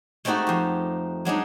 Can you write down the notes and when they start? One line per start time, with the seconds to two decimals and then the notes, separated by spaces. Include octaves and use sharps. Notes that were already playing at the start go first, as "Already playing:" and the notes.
0.25 G#3 A3 C4 D#4 F#4 G4
0.47 F2 G4
1.25 F#3 G#3 D4 D#4